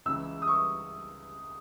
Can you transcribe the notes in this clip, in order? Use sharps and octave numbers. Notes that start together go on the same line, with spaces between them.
C#2 C#3 E3 E6
D#6
C#6